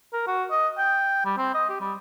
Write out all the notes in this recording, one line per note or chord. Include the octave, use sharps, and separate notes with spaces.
A#4
F#4
D#5
G5
G3
C4
D#5
G4
G3